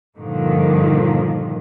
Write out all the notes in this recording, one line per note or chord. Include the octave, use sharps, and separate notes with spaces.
G2 A#2 D3 D#3 F3